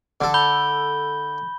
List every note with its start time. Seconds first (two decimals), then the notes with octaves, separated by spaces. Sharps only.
0.21 D3 A4
0.34 B5 G6 G7